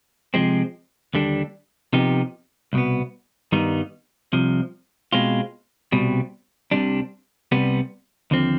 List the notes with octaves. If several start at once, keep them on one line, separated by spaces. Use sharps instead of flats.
C3 F3 G#3 C4
D#2 D3 G3 D4
C3 F3 B3 D#4 G4
C2 B2 B3
G2 D#3 G3 B3 D#4
C2 C3 F3
B2 G#3 C4 F4
C2 B2 G3 C4
C2 C3 G3 D4
C2 C3 G3 B3
D#2 D3 F3 C4